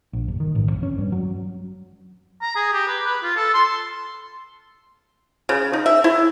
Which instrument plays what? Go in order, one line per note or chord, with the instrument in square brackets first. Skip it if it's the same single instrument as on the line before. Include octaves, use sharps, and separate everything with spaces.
[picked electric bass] A#1
F#1
D#3
A1
F2
C#4
G2
F#3
[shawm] A#5
G#4
G4
B4
B4
F4
A4
C6
[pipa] C#3
D#4
E5
E4